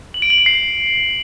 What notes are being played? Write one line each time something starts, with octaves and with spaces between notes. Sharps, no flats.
F#7
D7
F#7
D7
C7